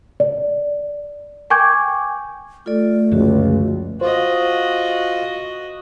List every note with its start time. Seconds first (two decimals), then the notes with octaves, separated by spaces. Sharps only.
0.20 D5
1.50 G5 G#5 C#6 D6 G6 G#6
2.66 A3 F4 A4 D5
3.12 C#2 F#2 D3 F3 F#4
4.01 F4 F#4 C5 D#5